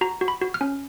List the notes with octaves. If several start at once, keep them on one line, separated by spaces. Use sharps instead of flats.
F#4 A#5
F#4
B5
F#4
F6
C#4